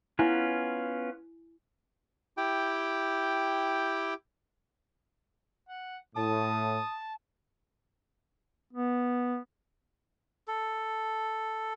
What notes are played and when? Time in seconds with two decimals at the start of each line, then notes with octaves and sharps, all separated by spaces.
0.19 B3 C#4 E4 F4 G#5
2.37 E4 G4 G5
5.68 F#5
6.16 A2 A5 D#6
8.73 B3
10.48 A4